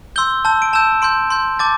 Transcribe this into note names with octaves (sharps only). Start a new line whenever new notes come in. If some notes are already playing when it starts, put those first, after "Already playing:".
C6 E6 G6 G7
A5 E6 G6
D7
A5 E6 G6 E7
C6 G6 D7
C6 G6
A5 D6 G6 A6